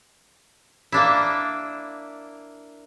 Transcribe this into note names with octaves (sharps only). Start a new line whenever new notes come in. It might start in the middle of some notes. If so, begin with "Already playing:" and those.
A#3 D4 E4